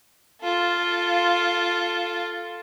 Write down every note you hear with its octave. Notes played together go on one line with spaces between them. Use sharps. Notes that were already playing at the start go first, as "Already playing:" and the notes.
F4 A4